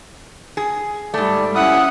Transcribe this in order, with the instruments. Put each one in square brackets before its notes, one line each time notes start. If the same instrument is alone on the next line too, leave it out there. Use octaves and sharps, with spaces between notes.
[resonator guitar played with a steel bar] G#4
[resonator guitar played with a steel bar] G#2 A3 [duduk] G3 [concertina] D5
[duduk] C#4 [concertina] E4 D#6 [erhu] F#5